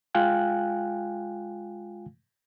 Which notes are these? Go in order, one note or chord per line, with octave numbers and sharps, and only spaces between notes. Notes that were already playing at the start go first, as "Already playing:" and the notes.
G#3 F4 F5 G5 G#5 F#6